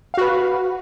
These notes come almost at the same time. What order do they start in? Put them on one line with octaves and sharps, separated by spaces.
F5 F#4 B4